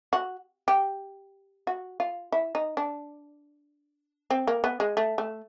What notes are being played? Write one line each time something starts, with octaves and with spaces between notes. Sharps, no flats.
F#4
G4
F#4
F4
E4
D#4
D4
C4
A#3
B3
G#3
A3
A3